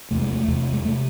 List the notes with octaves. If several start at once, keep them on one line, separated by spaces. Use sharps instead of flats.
E2 C3 A3
G#3
A3
E2 C3
G#3
A3
C3